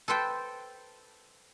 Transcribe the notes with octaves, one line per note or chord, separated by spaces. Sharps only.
A4 B4 C5 G5